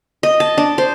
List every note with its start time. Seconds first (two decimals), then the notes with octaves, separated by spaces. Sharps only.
0.23 D#5
0.40 A5
0.58 D4
0.78 C5